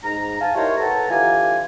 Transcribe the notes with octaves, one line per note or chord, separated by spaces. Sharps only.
G#2 A#5
F5 G#5 A5
D#4 E4 G4 A#4 C5 C#5
A2 A4 B4 F#5 A5 A#5
D3 E3 F4 G4 G#5